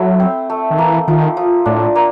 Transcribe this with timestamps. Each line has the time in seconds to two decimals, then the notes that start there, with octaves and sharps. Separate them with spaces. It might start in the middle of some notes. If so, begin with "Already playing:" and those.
Already playing: F#3 A3 E4
0.20 C4
0.50 A3
0.71 D#3
0.78 E3 A#3
1.08 D#3 F3
1.37 F3
1.66 A2 D4
1.95 A#3